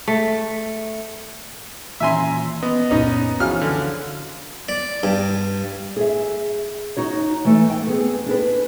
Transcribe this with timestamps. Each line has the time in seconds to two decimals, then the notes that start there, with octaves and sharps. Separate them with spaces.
0.08 A3
2.00 A#2 D#3 E3 C#4 E5 G#5 A#5 C6
2.63 B3 D#5
2.91 C#2 F#2 A#2 C#4 D#4
3.40 E3 F3 C#4 F#4 G#4 F5 F6
3.61 D3
4.69 D5
5.03 G2
5.96 G#4 E5
6.97 D#4 F#4 C#5
7.45 E3 A3
7.70 G5
7.87 B3 C4 G#4
8.26 D4 G#4 B4